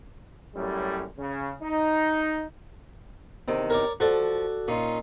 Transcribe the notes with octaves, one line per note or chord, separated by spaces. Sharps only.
F#2 A2 G3
C#3
D#4
E2 C3 D#3
A#4 C#5 D5
F3 F#4 A4 D5
A#2 C#4 D#4 F4